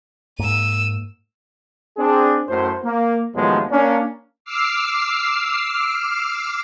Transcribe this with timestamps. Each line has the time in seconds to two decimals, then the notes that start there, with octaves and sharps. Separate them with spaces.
0.39 G#2 A#3 E6 D#7
1.98 C4 D4 G#4
2.48 F#2 A2 C5
2.84 A#3
3.35 D#2 A2 F3 F#3 G#3 B3
3.71 A#3 C#4 D4
4.45 D6 E6 F6 C7